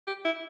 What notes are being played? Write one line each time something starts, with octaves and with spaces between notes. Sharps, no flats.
G4
E4